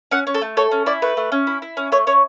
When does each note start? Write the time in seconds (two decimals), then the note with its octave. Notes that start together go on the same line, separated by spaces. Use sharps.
0.11 C#4 F#5
0.27 C#4
0.34 A4
0.42 A3
0.57 A4 C#5
0.71 C#4
0.86 E4 D5
1.02 A3 B4
1.17 A3
1.32 C#4
1.47 E4
1.62 E4
1.77 C#4
1.92 A3 C#5
2.07 C#4 C#5